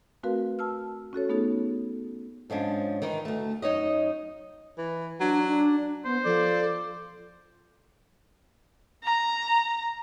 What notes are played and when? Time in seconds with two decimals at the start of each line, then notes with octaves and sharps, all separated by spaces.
0.23 A3 C4 F#4 A#4 B4 F5
0.59 A5 E6 F6
1.13 C#4 F#4 A4 C#5
1.29 A3 B3 D#4 G#4 A4
2.50 G#2 F3 C#4 D4
3.02 D#3 E3 D#4
3.25 D2 A3
3.62 F#2 D#4 C#5 D#5
4.78 E3
5.20 F#3 D4
5.48 D4
6.05 B3 C5
6.25 F3 A4 D5
9.03 A#5